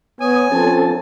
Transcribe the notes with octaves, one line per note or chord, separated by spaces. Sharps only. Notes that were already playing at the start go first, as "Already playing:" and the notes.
B3 C#5 G#5 D#6
F3 C4 C#4 A4 A5